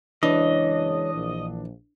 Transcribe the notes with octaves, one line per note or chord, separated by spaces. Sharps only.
F#1 E3 G#3 D4 C#5 D#5
A#1